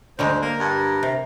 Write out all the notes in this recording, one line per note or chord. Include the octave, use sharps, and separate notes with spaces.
D2 D3 G3 G#3 C5
A#3 A#4
G2
C3